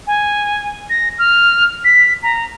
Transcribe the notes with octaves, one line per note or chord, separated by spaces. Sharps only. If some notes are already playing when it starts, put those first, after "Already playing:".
G#5
A#6
F6
B6
A#5